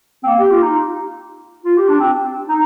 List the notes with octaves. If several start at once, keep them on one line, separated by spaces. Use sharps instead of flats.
C4
A#3
G4
F4
D#4
F4
G4
D4
C4
D#4